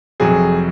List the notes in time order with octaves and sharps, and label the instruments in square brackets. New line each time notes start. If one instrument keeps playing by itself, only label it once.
[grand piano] F1 F2 C3 F#3 G#4